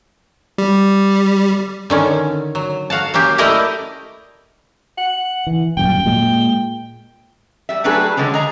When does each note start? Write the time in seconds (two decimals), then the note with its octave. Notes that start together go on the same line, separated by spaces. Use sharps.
0.58 G3
1.90 D3 D#3 C#4
2.55 F#3
2.90 F#4 F5 F#5 A5
3.14 F#3 A#3 C#4 G4
3.38 A3 E4 G4 A#4 D5 D#5
4.98 F#5
5.47 E3
5.77 D#1 F#2 G5
6.06 A#2 G#3
7.69 G3 E5
7.84 F#3 A3 D4 G4 G#4 B4
8.17 D3 F3 G#3 C#4
8.34 G#4 D#5 A#5